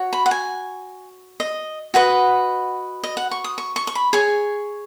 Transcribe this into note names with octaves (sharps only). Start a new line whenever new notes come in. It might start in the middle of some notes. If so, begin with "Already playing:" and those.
Already playing: F#4 C#5
B5
F#5
G#5
D#5
F#4 B4 D#5 F#5
D#5
F#5
C#6
D#6
C#6
C#6
C#6
B5
G#4 C#5 G#5